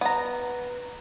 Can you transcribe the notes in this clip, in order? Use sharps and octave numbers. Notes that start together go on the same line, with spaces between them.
B3 A#5